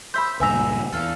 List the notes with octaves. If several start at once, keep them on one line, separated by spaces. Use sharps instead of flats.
C5 E5 B5 G6
C#2 G2 A#2 B4 E5 G#5 A#5 E6
E2 A4 F5